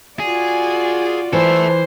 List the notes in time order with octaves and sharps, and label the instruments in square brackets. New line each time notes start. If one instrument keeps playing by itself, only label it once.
[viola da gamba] F4 F#4 D5 [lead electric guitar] G#4
[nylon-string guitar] E3 [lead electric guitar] A4 E5 [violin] C5